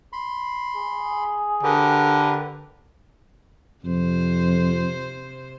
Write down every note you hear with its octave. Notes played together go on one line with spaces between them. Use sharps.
B5 C6
G#4
D3 G4 A#4 B4
F2 C3 C5